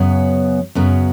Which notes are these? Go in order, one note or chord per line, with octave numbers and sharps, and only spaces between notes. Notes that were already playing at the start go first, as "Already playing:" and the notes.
Already playing: F#2 C#3 F#3 B3
F#2 C#3 F#3 B3